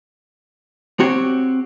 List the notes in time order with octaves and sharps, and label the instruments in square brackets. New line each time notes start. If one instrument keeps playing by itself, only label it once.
[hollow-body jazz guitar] C4 F#4 G4 C#5